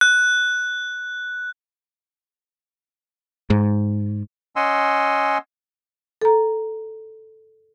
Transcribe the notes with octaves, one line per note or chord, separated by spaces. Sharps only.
F#6
G#2
C#4 D#5 F#5 G#5 C6 E6
A4 A#5